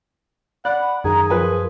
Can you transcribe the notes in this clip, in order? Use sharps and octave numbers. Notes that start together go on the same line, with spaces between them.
D5 F#5 B5 F#6
F#2 D#3 G#4 A#5
F3 A#4 B4 G#5